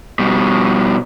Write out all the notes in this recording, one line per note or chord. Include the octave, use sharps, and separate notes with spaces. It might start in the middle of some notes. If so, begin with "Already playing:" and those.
B2 G3